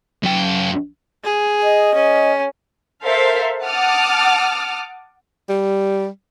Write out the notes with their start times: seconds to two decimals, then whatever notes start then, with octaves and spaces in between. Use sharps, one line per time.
0.23 F#2 G5
1.24 G#4
1.63 D#5
1.95 C#4
3.04 A4 A#4 C5 E5 F5
3.63 F#5 A5 D6 D#6 F6
5.49 G3